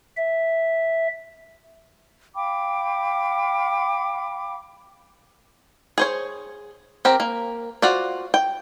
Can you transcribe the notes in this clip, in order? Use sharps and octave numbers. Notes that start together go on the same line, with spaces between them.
E5
F5 G5 B5 D6
G#4 C5 C#5
C4 G4 A#4
A#3
F4 F#4 C5 D5
G5